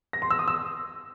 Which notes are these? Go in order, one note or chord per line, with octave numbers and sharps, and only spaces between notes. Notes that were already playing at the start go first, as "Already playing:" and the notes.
A#6
C6
E6
D#6
E6